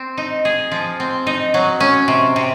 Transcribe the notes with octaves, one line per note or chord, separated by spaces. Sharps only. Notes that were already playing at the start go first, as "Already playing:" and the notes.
Already playing: C4
D#4
G#4
F3
C4
D#4
F#3
C#4
C3
C3